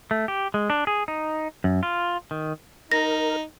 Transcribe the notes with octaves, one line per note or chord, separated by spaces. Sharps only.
A3
G4
G#3
D4
G#4
D#4
F#2
F4
D#3
D#4 A#4 A#6